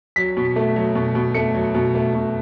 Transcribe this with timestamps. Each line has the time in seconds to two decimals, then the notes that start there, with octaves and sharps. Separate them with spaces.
0.16 F#3 B6
0.37 B2
0.56 A3
0.76 F#3
0.95 B2
1.15 B2
1.34 A3 C#7
1.54 F#3
1.75 B2
1.95 A3
2.14 B2